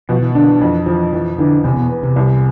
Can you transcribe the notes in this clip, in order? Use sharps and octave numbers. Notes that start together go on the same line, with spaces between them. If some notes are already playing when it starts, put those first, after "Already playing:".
B2 F3
E3
D3 D4
E3
F2 E3
E3 F3
F2 E3
D3 E3
E2 C3
B2
B3
C3
C2